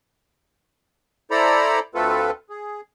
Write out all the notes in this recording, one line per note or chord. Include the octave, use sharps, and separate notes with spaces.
E4 A4 C5 D5 A#5 B5
D2 A3 C4 F4 A4 B4
G#4